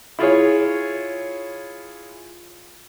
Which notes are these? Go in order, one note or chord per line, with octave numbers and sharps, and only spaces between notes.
E4 F4 G#4 C#5